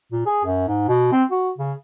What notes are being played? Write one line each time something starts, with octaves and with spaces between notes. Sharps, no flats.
A#2
G#4
F#2
G#2
B2
C4
F#4
C#3